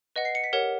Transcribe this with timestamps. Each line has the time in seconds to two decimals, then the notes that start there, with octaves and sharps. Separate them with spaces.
0.16 B4 D#5 F#5
0.25 C7
0.35 C#7
0.44 B6
0.53 G4 A#4 C#5 F#5